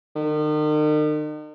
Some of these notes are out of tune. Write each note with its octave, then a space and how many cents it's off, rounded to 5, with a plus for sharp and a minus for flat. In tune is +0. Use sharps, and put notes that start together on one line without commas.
D#3 -40